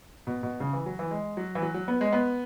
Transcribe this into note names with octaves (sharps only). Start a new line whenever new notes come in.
B2
B2
C#3
E3
F#3
E3
G#3
F#3
E3
F#3
F#3
B3
G#3
B3